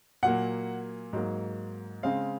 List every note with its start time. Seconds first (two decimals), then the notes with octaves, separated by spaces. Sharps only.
0.23 A#2 F#3 A#3 F#5
1.13 G#2 F#3 A#3
2.03 C#3 G#3 C4 F5